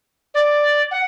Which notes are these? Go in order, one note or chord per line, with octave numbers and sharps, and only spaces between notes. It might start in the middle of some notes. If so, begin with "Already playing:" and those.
D5
F#5